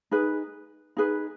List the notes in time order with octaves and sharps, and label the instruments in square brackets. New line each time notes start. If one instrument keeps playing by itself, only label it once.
[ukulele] D#4 G#4 B4
D#4 G#4 B4